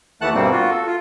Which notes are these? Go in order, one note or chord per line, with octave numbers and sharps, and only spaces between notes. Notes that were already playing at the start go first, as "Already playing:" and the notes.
D#2 E3 A3 F#5 A5 F#6
G2 B2 G3 A#3 C4
F4 F#4
A4
F4